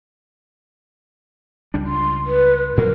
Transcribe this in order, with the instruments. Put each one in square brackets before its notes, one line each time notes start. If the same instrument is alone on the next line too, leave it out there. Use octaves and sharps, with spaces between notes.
[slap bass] C#2 G3 D4
[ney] C6
B4
[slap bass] A#2 F#3 [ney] A#4